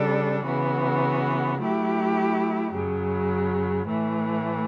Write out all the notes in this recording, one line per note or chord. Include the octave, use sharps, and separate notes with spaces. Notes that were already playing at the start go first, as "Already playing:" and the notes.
Already playing: C#3 G3 D4 A4
C#3 E3 B3 F#4
F#3 A3 E4 G4
F#2 C#3 F#3
A2 E3 A3